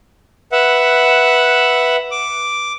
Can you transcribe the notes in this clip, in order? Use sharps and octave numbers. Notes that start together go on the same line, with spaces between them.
B4 E5 F#5
D6